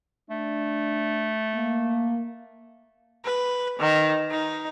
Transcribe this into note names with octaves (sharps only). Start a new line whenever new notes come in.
A3 D4
A#3
B4
D#3
D#4